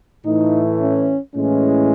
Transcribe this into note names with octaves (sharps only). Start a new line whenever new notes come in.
A2 E3 A3 D#4
C#4
A2 E3 G#3 C#4